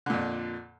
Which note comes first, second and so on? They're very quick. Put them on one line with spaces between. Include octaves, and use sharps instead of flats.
D3 A#2 F2